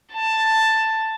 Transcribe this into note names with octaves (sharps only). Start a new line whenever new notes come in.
A5